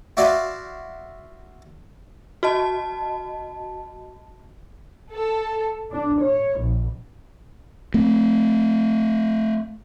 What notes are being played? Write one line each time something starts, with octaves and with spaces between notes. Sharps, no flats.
E4 F#4 D5 E5 F5 C6
F#4 D#5 A5
A4
D4
C#5
A#1
A3 C4